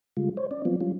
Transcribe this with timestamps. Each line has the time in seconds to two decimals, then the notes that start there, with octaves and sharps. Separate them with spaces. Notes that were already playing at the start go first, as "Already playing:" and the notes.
0.17 C#3 G3 G#3 F4
0.37 C5 C#5
0.51 C#4 D5
0.65 F3 F#3 B3 C4 F4
0.81 F#3 G3 C#4 F4